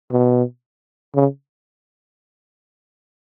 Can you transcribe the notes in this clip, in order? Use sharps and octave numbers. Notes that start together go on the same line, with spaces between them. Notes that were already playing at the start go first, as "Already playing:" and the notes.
B2
C#3